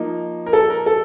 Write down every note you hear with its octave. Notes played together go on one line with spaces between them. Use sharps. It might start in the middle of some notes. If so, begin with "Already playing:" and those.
Already playing: F3 A#3 D#4
A#4
A4
A#4
A4